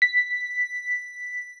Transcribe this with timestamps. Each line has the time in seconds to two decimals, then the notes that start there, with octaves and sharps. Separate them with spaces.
0.02 B6